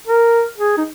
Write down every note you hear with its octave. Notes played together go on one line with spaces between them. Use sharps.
A#4
G#4
D#4